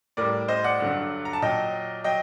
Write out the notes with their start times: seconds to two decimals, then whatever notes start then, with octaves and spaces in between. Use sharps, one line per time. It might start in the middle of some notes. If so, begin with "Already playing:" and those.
0.17 A2 G3 A#4 D5
0.48 C5 D#5
0.64 D5 F#5
0.80 G2 D3 F#3
1.25 A#5
1.33 A5
1.42 A#2 F#3 D#5 G5
2.04 F#3 D#5 G5